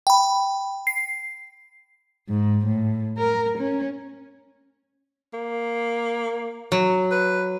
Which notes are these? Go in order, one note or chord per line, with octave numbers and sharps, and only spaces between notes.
G5 B5
C7
G#2
A2
A#4
C#4
A#3
F#3
B4